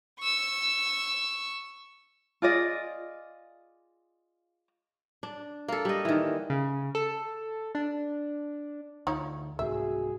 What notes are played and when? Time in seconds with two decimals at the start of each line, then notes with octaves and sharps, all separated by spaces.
0.20 C#6 E6
2.42 F4 G#4 D5 D#5
5.23 D4
5.68 A#3 A4
5.85 G3 D#5
6.05 D#3 E3
6.50 C#3
6.95 A4
7.75 D4
9.07 D2 D#4 F4 C#5
9.59 C2 G#2 F#4 G#4 E5